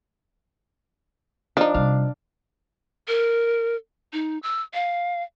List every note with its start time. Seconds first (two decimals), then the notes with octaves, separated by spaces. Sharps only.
1.57 F3 D4 D#4
1.74 C3 G3 F5
3.08 A#4
4.13 D#4
4.43 E6
4.74 F5